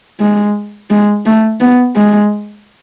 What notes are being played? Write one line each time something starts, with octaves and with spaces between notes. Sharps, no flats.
G#3
G#3
A3
B3
G#3